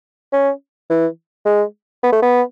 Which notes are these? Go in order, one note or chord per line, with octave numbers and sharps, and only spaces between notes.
C#4
E3
G#3
B3
A3
B3